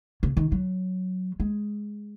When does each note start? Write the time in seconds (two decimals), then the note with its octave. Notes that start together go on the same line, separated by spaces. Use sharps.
0.23 C#3
0.37 D#3
0.52 F#3
1.40 G#3